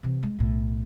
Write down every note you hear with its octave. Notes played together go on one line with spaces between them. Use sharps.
C3 E3
G#3
B1 A2